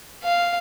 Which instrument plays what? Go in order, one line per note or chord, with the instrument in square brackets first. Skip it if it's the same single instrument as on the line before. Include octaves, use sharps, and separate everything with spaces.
[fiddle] F5